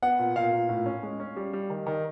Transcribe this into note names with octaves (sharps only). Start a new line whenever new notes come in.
B3 F#5
A#2
A#2 F5
A#2
A2
C#4
G#3
C#4
G3
G3
D#3
D#3